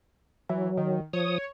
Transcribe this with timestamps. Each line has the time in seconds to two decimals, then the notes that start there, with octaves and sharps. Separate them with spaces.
0.50 E3 F#3
0.77 D#3
1.13 F3 C#5 D#6